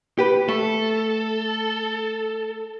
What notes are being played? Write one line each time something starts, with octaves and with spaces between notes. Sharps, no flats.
G4 B4
A3 A4